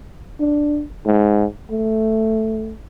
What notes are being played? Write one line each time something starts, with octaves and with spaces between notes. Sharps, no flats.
D4
G#2
A3